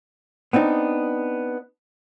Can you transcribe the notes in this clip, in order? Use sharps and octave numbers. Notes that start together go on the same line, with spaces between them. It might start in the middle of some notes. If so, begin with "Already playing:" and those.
B3 C4 D4 D#4